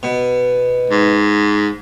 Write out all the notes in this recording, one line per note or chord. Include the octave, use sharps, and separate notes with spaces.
B2
G#2